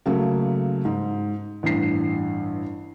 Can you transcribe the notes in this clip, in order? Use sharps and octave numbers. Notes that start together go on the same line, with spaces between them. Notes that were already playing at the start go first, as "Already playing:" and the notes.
C#3 F#3 A3 A#3
G#2
A1 G2 C7